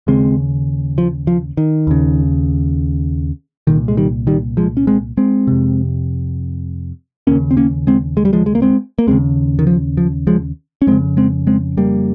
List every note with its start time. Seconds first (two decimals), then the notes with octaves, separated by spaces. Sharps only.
0.07 D#2 C#3 G#3 C4
0.98 F3
1.27 F3
1.57 D#3
1.87 D#2 C#3
3.67 C2 A#2 D#3
3.88 G#3
3.97 D#3 G3
4.27 D#3 G3
4.57 F3 G#3
4.77 C#4
4.87 G#3 C4
5.17 G#3 C4
5.47 F2 C3
7.27 D#2 C#3 A#3 C#4
7.51 C4
7.57 A#3 C#4
7.87 G#3 C4
8.17 G#3
8.25 G3
8.33 F3 G#3
8.46 G#3
8.55 A#3
8.62 G#3 C4
8.99 A#3
9.07 D#2 C#3 G#3 C4
9.59 D#3
9.67 F3
9.97 F3
10.27 F3 G#3
10.82 C#4
10.87 F2 G#3 C4
10.92 C#3
11.17 G#3 C4
11.47 G#3 C4
11.77 G3 A#3